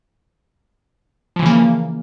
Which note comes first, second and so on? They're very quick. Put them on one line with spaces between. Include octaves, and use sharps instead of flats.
F3 E3 C#3 A#3